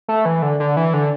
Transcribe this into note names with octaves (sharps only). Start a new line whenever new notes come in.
A3
E3
D3
D3
E3
D3